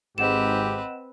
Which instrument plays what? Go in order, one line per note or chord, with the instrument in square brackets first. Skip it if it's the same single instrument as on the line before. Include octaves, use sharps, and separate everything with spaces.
[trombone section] G#1 G#2 [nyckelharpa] C4 B4 [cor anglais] G4 [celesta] D#5 F#5 E7